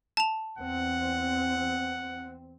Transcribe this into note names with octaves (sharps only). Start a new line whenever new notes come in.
A5 F7
E2 C4 F#5